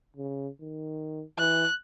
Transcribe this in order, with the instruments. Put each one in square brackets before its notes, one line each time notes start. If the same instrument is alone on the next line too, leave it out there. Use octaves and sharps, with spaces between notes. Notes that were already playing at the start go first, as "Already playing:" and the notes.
[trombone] C#3
D#3
[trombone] E3 [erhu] F#6